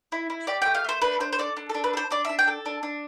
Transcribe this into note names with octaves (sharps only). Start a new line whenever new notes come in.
E4
E4
G4 D5
A3 G5
F5
A3 C5
D4 B4
D4 C5
C5
A4 D5
D4
A4
D4
B4
A4
C5
D4 D5
E5
D4
G5
A4
D4
D4